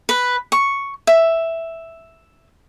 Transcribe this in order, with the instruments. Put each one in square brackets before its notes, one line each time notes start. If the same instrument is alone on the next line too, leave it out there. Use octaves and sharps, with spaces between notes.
[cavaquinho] B4
C#6
E5